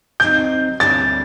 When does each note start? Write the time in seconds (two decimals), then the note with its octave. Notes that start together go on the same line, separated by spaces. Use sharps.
0.20 D2 C3 F#3 C4 D#4 G6
0.80 D2 C3 G3 A#3 D4 A6